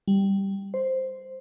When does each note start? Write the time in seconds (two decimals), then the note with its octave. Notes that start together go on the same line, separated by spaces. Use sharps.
0.08 G3
0.74 C5